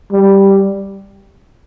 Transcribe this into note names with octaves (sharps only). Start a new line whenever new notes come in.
G3